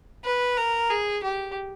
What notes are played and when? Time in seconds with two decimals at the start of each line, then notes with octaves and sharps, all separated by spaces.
0.25 B4
0.57 A#4
0.90 G#4
1.24 G4